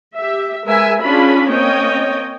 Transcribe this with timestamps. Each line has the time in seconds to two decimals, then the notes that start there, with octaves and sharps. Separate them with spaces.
0.15 G4 E5
0.65 G#3 A#4 B4 E5 G#5
1.02 C#4 D4 F4 G#4 B5
1.50 A#3 C4 C#4 C#5 D#5 G5